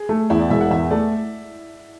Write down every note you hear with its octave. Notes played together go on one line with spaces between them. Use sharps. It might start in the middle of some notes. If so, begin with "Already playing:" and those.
Already playing: G#4
A3
E2 E4
D5
E1 E5
F#5
E2 E5
A3 D5